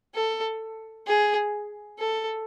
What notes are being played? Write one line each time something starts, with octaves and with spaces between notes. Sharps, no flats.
A4
G#4
A4